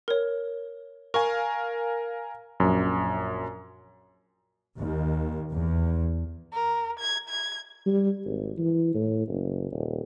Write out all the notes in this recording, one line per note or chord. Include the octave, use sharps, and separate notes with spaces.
A#4 C#5
A#4 F5 G#5 C#6
A#1 F#2
D#2
E2
A#4
G#6
G#6
G3
G#1
E3
A2
F#1
D#1